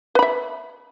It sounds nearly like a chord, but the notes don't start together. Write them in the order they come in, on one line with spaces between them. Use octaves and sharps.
B4 B5 E5